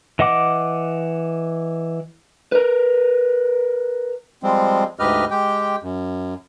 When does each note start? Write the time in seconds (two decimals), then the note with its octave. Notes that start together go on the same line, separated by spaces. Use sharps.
0.19 E3 D#5 F#5 D6
2.52 A#4 B4
4.43 F3 G3 G#3 C4
4.99 D2 G#2 G4 B4 D#5 F6
5.31 G#3 G4 G5
5.83 F#2